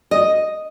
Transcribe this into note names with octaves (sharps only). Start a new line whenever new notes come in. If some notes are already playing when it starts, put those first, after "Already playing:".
D#5